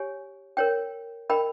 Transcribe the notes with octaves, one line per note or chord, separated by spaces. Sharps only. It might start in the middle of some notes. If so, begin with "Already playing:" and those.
Already playing: G4 C#5 G#5
A#4 C#5 G5
A#4 D#5 G5 B5